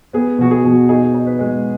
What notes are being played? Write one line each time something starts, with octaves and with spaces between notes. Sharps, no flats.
B3 G#4
B2 F#4
G#4
B2
D#4 G#4
D#4
B4
G#3